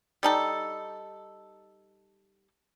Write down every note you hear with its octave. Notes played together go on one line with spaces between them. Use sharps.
G3 D#4 A4